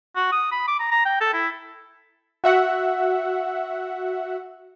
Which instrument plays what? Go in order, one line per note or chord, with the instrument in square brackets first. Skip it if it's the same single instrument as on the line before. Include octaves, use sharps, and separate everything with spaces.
[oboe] F#4
D#6
B5
D6
A#5
A#5
G5
A4
E4
[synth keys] F#4 E5 F#5